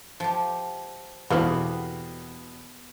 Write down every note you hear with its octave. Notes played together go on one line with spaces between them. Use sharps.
F3 G4
E2 B2 D3 B3 C4 G4 B4 F5